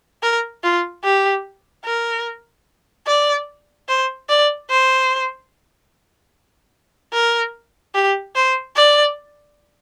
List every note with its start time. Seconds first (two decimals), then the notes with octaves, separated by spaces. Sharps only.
0.23 A#4
0.63 F4
1.04 G4
1.86 A#4
3.07 D5
3.89 C5
4.29 D5
4.70 C5
7.14 A#4
7.95 G4
8.35 C5
8.76 D5